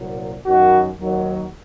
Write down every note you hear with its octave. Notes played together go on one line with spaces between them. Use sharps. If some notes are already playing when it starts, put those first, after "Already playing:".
Already playing: C2 A#2 F#3
F#2 D#3 F#3 F#4
D#2 D#3 F#3